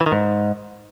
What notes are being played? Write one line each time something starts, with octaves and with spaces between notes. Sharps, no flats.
E3
D#3
G#2